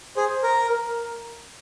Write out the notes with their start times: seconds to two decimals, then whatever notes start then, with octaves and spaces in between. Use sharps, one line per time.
0.16 G#4 C5
0.43 A#4
0.69 A#4